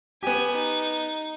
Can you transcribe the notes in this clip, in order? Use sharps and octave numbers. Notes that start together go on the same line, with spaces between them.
B3 G4 G#5
D#4